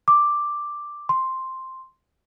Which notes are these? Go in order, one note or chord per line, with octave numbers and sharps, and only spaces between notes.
D6
C6